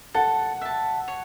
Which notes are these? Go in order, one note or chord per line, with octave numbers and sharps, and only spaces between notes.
A4 F#5
E5 A5
C#5